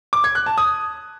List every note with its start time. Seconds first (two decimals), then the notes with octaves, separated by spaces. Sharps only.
0.13 D6
0.24 G#6
0.35 F#6
0.46 A5
0.58 D#6